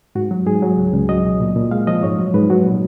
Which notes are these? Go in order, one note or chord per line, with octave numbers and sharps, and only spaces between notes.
G#2 F#4
F#3
G#2 G#4
F#3
C#2
C#2
F#3 D#5
B2
A#2
A#2
G#3 F5
F3 D#5
G#2 C#5
F#3
G#2 B4
F#3 F#4
A#2